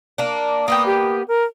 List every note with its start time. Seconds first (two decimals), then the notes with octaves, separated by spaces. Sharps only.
0.18 A#3 D4
0.68 A#3 B3 G5 D#6
0.86 G4
1.28 A#4